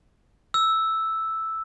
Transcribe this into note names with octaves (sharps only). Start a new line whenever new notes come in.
E6